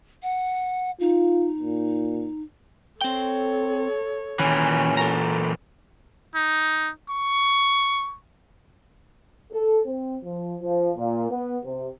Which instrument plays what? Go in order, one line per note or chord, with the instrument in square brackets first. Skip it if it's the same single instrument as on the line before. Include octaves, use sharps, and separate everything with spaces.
[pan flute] F#5
[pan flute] D#4 [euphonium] F4
[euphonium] A#2
[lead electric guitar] C4 G5 [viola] A4 C#5
[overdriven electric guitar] A#2 E3 [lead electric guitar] D#3 [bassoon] C#4
[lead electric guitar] A4 A#5
[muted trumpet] D#4
C#6
[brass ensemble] A4
C4
F3
F3
A#2
B3
C3